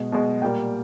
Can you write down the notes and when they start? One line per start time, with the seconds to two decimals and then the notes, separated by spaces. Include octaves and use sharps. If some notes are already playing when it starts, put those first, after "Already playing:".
Already playing: B2 G#3
0.12 B2 G#3
0.42 A#2 G3 A#3 G5